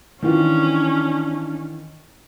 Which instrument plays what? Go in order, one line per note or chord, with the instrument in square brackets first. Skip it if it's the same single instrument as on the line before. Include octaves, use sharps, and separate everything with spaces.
[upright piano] D#3 E3 F4 [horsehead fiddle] C#4 [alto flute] D4